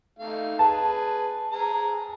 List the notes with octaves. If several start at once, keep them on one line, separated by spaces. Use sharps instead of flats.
A3 D#4 F5
G#4 B4 A5
G#4 A#5